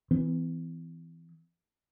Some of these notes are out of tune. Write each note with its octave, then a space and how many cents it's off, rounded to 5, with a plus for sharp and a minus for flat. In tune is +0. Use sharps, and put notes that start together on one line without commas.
E3 +0 C4 -45